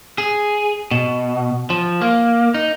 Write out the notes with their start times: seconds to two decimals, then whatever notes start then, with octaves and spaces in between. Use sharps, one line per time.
0.18 G#4
0.91 B2
1.70 F3
2.01 A#3
2.54 D#4